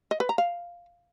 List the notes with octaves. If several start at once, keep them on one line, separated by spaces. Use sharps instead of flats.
D#5
B4
A#5
F5